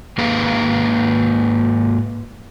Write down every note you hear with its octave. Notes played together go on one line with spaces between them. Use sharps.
G#2 A#3 G#4 B4 F5 A#5